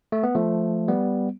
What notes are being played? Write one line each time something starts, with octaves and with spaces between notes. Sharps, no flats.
A3
B3
F3 A3
G3 B3